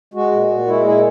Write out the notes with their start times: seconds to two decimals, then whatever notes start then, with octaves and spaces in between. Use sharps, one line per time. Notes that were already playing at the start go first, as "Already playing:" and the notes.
0.14 G#3 F#4
0.32 A#2
0.50 A#2
0.67 G#3 E4
0.84 A#2 E4 G#4